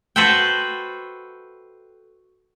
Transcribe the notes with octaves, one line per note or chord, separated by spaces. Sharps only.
F#4 A4 B4 C5 E5 G5